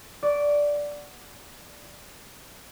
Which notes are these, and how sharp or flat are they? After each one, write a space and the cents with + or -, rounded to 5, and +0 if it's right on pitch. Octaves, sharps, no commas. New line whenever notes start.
D5 -5 F#5 +0 C#6 +20